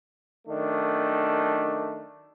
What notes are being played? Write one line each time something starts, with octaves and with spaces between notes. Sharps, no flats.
F#2 D#3 A3 D4